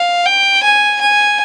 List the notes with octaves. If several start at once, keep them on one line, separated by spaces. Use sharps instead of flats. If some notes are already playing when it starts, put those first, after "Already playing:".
Already playing: F5
G5
G#5
G#5